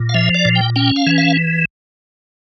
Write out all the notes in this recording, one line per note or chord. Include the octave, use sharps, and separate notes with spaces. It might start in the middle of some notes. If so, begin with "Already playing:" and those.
Already playing: A#2
F5
F3 E5
D5
A#2
G5
C#4 G5
F5
E3
F5